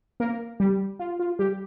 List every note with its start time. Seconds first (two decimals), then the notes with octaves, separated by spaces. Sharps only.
0.20 A#3 A#4
0.60 G3 G4
0.99 F4
1.20 F4
1.39 G3 G4